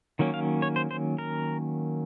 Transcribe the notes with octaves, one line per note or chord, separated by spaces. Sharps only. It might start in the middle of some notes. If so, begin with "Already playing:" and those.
D#3 F#3 A#3 C#4
F5
C#5
C5
C5
A#4